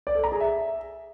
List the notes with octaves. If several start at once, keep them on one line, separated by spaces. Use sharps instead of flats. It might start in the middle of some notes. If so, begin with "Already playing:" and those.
D5
A4
A#5
G#4
E5